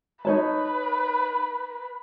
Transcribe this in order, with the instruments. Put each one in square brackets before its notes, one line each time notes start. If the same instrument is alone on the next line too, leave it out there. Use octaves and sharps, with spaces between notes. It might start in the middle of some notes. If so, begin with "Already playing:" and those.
[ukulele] D#4 C#5 A5 [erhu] B4